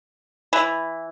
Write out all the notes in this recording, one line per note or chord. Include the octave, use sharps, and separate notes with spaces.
E3